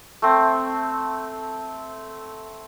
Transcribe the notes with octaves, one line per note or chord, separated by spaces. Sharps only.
A3 C4